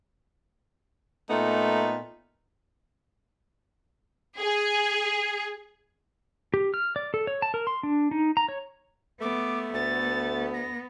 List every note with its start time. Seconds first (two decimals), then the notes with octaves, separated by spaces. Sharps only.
1.30 A#2 A3 B3 D#4
4.38 G#4
6.54 G4
6.74 F6
6.96 D5
7.14 A4
7.27 C#5
7.42 A5
7.54 A#4
7.67 C6
7.83 D4
8.11 D#4
8.37 A#5
8.49 C#5
9.21 A3 B3 D6
9.74 D2 B3 A6
10.53 A#6